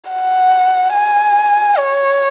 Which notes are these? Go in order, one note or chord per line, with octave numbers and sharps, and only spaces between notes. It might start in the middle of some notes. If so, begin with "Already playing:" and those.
F#5
G#5
C#5